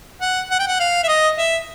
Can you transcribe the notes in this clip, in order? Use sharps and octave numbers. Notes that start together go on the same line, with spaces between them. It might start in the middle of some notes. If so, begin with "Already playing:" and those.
F#5
F#5
G5
F#5
F5
E5
D#5
E5